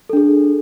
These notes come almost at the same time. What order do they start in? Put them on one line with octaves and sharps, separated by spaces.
A4 D4 G#4